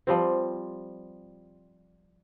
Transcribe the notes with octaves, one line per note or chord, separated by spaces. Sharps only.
F3 G3 C4